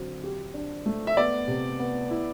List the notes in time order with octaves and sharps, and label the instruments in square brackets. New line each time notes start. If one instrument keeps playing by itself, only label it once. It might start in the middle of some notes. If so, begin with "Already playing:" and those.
Already playing: [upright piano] D3 F#3 C4
G4
D4
A3
[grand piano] E5
[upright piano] B3 [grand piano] D5
[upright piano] C3
B3
E4